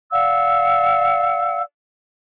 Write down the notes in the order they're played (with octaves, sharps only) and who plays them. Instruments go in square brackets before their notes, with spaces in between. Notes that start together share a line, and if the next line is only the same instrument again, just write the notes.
[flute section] D5 F5 F#5 E6